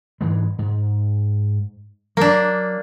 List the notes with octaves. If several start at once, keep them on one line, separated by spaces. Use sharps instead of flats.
G#2 E3 G#3
G#2
F#3 A#3 D4